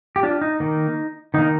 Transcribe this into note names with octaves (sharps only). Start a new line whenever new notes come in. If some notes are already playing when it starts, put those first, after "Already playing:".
G4
D4 F4
D#4
D#3 A#3
D#3 A#3 D#4